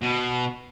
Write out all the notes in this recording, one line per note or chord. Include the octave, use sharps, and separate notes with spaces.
B2